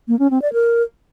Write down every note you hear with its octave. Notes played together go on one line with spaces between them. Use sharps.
A#3
C#4
C4
D5
A#4